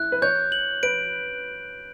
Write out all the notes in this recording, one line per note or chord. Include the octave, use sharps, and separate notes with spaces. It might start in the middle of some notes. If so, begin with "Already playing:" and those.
Already playing: E4 F#6
B4
C#5 G6
F#7
B4 D7